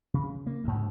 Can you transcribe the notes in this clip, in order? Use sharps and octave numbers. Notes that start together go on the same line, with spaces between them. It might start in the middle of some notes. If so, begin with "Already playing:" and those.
C#3
A#3
D2 G#2